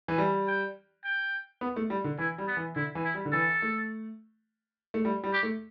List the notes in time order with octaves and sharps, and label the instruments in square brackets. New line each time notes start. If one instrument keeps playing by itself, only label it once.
[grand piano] E3
G3
[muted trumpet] G5
G5
[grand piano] B3
A3
G3
D3
[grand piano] E3 [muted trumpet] E4
[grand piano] G3
[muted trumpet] B3
[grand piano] E3
[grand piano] D3 [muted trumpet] E4
[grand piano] E3
[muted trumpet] E4
[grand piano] G3
D3
[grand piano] E3 [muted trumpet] A4
[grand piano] A3
A3
G3
G3
[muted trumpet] G4
[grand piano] A3